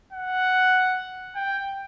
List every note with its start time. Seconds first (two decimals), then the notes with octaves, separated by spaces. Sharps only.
0.13 F#5
1.36 G5